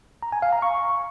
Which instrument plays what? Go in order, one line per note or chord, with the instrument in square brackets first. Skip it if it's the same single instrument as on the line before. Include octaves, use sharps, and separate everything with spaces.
[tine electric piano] A#5
G#5
F5
A#5
C#6